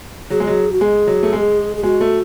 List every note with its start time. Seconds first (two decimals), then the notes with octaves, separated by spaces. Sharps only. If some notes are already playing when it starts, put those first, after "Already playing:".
0.30 F#3 G#4
0.40 G#3
0.47 F#3
0.73 F#4
0.81 G#3 G#4
1.07 F#3
1.23 A3
1.33 G#3
1.77 G#4
1.83 G#3 F#4
2.01 A3